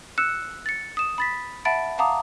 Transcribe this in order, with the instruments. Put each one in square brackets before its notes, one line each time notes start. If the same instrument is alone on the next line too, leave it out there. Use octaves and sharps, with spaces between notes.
[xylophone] E6 F#6 C#7 E7
A6 C#7
D#6 E7
B5 A6 B6
E5 F#5 A5 B5 A6 D7
F5 F#5 A5 A#5 D6 D#6